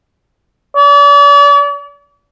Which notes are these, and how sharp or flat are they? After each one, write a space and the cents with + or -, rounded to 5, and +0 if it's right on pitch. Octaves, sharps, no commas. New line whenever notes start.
D5 -40